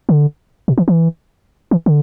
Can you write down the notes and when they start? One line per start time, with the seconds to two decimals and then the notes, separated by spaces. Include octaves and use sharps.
0.09 D3
0.68 B2
0.78 E3
0.88 E3
1.71 E3
1.86 D3